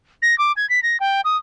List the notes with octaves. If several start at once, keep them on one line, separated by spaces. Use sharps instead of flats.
A#6
D6
G#6
B6
A#6
G5
D#6